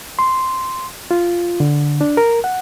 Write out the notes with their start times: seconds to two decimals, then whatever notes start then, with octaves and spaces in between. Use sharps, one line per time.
0.19 C6
1.11 F4
1.60 D3
2.01 D4
2.17 A#4
2.44 F#5